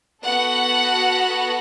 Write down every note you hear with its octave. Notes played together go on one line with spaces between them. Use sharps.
B3 F#4 A4 F#5